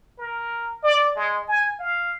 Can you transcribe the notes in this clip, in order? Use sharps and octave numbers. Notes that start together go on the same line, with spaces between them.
A#4
D5
G#3
G#5
F5